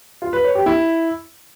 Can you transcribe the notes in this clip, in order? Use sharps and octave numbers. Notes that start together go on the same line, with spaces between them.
F4
B4
C#5
G4
E4